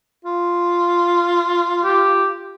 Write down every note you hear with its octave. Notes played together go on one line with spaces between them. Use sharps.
F4
G4